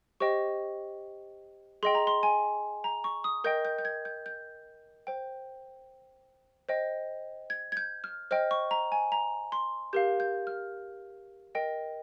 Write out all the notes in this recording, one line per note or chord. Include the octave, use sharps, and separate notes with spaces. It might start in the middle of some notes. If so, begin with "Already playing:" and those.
G4 C5 D#5 G5 C#6
G#4 D#5 G5 C6
A#5
C6
G#5
A#5
C#6
D#6
A#4 D#5 G5 G6
G6
G6
G#6
G6
G6
C5 G5
C5 D#5 G5
G#6
G#6
G6
F6
C5 D#5 G5 F6
C#6
A#5
G#5
A#5
C6
G4 A#4 F5 G6
G6
F6
A#4 D#5 G5